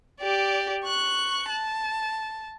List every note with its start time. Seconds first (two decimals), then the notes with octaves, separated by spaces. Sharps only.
0.21 G4 D5
0.85 C#6 F#6
1.50 A5